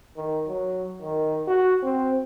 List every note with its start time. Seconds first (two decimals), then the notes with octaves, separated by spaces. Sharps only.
0.17 D#3
0.48 F#3
1.02 D#3
1.48 F#4
1.82 C4